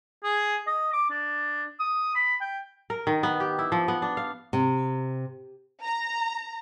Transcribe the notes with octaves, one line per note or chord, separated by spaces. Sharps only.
G#4
D#5
D6
D4
D#6
B5
G5
A#4
D#3
B3
G4
E4
F3
B3
D4
F5
C3
A#5